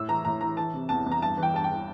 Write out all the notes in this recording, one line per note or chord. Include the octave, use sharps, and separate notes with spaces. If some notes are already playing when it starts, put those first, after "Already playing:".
Already playing: A2 E6
E3 A#5
A2 A#5
E3 A#5
E3 A5
C3
E2 A5
E2
A#5
G2 A5
E3
G5
G2 A5
G5
E3